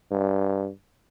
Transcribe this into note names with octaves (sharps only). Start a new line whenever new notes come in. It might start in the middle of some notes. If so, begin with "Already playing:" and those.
G2